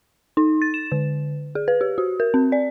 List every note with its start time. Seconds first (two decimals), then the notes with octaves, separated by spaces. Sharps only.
0.37 D#4
0.62 A6
0.74 E7
0.92 D3
1.55 G#4
1.68 B4
1.81 G4
1.98 F#4
2.20 A#4
2.34 C4
2.52 D5